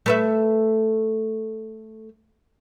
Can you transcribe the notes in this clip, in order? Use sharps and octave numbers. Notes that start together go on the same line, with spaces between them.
A3 B4 E5